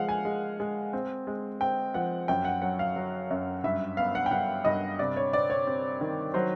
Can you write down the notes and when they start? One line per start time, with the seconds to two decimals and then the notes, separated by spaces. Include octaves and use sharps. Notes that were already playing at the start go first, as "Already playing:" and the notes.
Already playing: F3 G#3 F5 F#5
0.09 G#5
0.25 G#3
0.60 G#3
0.93 C4
1.27 G#3
1.61 C4 G5
1.94 F3 F#5
2.28 F#2 G5
2.45 F#5
2.62 F#3 F#5
2.79 F5
2.96 F#3
3.30 F#2
3.64 G2 E5
3.97 B3 F5
4.15 F#5
4.26 G5
4.31 G2 F#5
4.65 G2 D#5
4.99 C3 D5
5.16 C#5
5.33 C4 D5
5.50 C#5
5.67 C4
6.01 D#3
6.34 F#3 C5